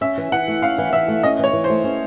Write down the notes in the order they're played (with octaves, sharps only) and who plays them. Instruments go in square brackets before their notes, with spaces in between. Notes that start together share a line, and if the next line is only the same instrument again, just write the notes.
[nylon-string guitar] C#4 [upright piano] E5
[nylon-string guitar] E3
[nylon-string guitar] E3 [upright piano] F#5
[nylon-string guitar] A3
[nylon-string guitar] C#4 [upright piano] F5
[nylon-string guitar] E3
[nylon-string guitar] E3 [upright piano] E5
[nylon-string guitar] A3
[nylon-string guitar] C#4 [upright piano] D#5
[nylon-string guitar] E3 [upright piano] C#5
[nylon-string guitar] E3
[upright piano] C5
[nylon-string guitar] A3
C#4